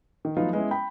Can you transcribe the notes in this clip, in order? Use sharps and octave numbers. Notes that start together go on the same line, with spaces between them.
D#3
F3 F#3 A3 B3 D#4 F4
G#3 B3 C#4 E4
G5 B5